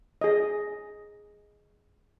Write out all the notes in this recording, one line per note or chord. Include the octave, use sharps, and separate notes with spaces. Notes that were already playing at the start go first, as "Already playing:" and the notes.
G#4 D#5